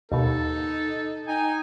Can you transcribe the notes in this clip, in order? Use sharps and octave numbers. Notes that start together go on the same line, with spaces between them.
D#2 B2 D#4 A4
D#4 G5 G#5